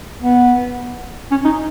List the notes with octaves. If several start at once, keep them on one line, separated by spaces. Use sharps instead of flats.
B3
C#4
D#4